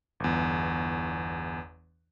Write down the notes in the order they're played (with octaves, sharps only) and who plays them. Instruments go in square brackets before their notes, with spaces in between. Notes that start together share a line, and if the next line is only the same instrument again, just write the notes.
[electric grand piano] G1 E2